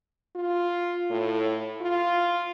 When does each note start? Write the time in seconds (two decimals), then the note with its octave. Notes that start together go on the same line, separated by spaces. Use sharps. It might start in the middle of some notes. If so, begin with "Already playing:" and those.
0.36 F4
1.11 A2
1.81 F4